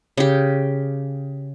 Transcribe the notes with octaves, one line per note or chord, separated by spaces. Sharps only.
C#3 G4